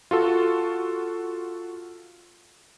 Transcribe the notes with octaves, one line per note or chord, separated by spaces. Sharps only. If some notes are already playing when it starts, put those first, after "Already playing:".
F4 F#4 A4